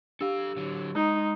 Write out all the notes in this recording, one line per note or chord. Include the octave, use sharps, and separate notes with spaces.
D4 G4 A4 F5 E6
D3 F#3
G#3 D#4 A#5